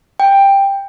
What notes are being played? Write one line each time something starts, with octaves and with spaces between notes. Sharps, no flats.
G5